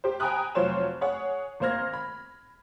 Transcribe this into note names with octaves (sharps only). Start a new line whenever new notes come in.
G4 C5
G5 G#5 A#5 B5 D#6 F#6
F1 F#3 F4 C5 C#5 E7
G#4 C#5 F#5
G#1 A#3 C5 F6 G#6 A#6
B5